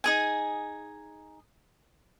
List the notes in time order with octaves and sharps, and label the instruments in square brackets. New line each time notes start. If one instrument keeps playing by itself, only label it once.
[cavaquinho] D#4 G#4 G#5